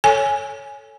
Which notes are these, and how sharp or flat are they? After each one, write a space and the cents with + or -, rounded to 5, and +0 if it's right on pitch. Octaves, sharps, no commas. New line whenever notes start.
A4 +0 C#5 +0 G#5 +0